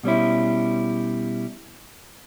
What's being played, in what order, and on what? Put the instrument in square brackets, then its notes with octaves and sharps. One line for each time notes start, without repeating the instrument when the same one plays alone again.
[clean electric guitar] B2 G3 C#4 E4